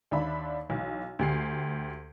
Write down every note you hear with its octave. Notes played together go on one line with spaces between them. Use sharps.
D#2 D4 E5 B5
B1 E3
D2 G4 C7